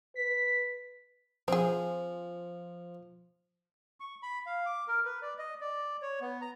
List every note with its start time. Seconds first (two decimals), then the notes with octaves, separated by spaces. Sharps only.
0.15 B4 B6
1.48 F3 C4 G#4
4.00 C#6
4.23 B5
4.46 F5
4.66 D6
4.88 A#4
5.05 B4
5.22 D5
5.38 D#5
5.61 D5
6.02 C#5
6.21 B3
6.41 A#5